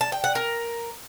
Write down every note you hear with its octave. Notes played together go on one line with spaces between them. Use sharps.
A5
G5
F#5
A#4